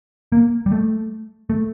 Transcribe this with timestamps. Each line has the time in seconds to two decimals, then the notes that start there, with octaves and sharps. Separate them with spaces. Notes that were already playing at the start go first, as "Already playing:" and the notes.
0.32 A#3
0.66 G3
0.72 A3
1.50 A3